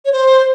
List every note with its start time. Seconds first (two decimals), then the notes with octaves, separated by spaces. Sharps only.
0.05 C#5
0.12 C5